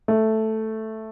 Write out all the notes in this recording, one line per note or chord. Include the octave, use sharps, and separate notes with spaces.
A3